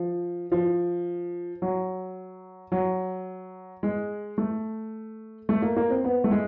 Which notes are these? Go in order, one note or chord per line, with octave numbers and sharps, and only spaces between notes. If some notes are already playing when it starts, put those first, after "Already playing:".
Already playing: F3
F3
F#3
F#3
G#3
A3
A3
A#3
A#3
C4
B3
A3
G#3